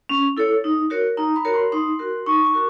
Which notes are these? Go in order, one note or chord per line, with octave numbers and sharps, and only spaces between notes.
C#4
E4 A4 C#5
D#4
F#4 A#4 C#5
D#4 A#5
B5
F#4 A#4 C#5
C6
D#4 C6
F#4 A#4
D#4 C#6
D6
F#4 A#4